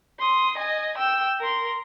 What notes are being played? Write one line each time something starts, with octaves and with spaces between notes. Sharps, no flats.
C6 D#6
D#5 G#5
G5 E6
A#4 C6